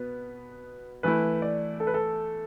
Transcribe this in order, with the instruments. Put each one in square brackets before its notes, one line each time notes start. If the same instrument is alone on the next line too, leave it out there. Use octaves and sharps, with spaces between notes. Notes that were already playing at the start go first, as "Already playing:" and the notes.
Already playing: [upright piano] B2 B3 [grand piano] B4
[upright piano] E3 A3 E4 [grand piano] B4
[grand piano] D5
A4
B4
A4